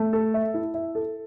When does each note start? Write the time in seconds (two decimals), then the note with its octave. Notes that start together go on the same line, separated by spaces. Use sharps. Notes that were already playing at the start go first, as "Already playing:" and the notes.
Already playing: A3
0.13 A4
0.34 E5
0.54 E4
0.74 E5
0.95 A4